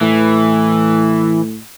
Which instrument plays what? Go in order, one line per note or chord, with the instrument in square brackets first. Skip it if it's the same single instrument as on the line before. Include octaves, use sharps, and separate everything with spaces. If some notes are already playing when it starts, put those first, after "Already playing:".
[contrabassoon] A2 [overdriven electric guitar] E3